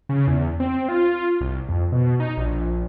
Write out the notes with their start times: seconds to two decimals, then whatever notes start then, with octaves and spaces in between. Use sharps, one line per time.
0.09 C#3
0.28 E2
0.60 C4
0.88 F4
1.41 C2
1.69 F2
1.92 B2
2.20 D#4
2.38 A#1